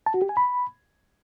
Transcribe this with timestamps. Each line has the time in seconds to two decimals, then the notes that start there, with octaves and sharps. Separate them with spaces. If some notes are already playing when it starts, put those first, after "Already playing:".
0.06 A5
0.14 F#4
0.22 G4
0.29 G#5
0.37 B5